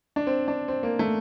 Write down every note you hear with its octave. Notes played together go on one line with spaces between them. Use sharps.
D4
C4
D4
C4
A#3
A3